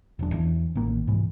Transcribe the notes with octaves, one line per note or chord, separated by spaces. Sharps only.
E1 F3 D4
E2 E3 D4
A1 D#3 A#3
C2 G#2 B2 E3